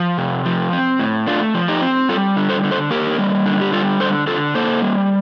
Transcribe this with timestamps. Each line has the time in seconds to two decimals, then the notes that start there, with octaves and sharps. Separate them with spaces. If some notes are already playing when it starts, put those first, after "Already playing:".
Already playing: F3
0.18 C3
0.45 F3
0.73 C4
0.99 A2
1.27 A3 D4 F4
1.55 F3
1.68 D#4 G4
1.82 C4
2.09 G3 F4 A4
2.37 D3
2.50 A4 C5
2.64 D3
2.71 A4 C5
2.90 A#3 G4 A#4
3.19 G3
3.46 D3
3.61 G4
3.73 G3 F4 A4
4.00 D3 A4 C5
4.27 D3 F4 A4
4.55 A#3 A4 C5
4.82 G3